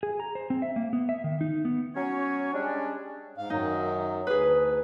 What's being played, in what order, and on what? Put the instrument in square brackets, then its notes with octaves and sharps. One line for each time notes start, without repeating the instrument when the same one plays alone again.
[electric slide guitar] G#4
A#5
C5
C4
E5
A#3
B3
E5
D#3
D#4
B3
[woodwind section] F#3 C#4 C#5
G3 G#3 C#4 D4
[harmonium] G#2 F5
[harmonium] F#2 D#3 F#3 [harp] D#4
[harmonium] D2 [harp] G#4 B4